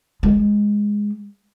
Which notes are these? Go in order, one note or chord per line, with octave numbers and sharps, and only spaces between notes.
G#3